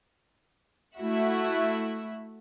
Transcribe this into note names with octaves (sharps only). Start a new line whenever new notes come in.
A3 E4 F#4 E5 F#5